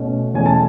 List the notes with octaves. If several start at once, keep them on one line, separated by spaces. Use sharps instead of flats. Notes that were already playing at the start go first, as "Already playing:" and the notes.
Already playing: B2 A3 C#4
E2 B2 A3 C#4 G#5
A5